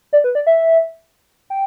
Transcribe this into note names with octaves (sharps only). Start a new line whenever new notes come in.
D5
B4
D5
E5
G5